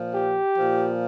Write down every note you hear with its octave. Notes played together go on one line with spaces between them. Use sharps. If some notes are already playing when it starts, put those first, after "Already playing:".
Already playing: A#2 F3
G4
A#2 F3